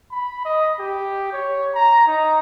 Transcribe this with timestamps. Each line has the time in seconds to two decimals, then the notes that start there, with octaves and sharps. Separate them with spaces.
0.11 B5
0.45 D#5
0.80 G4
1.33 C#5
1.75 A#5
2.07 D#4